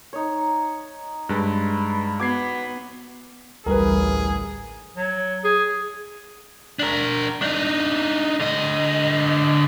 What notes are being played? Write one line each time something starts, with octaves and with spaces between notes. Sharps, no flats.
D#4 C#5
G2 G#3 B4
B3 F#4 D6 G#6 C7
A1 D2 G3 G#4 A#4 B4
F#3
G#4
D4 A#4
D4 D#4
D3 D#5